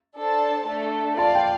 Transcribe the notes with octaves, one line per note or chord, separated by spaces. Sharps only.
D4 A4 C5 A5
A3 D4 A4
F4 D5 F5 A5
G5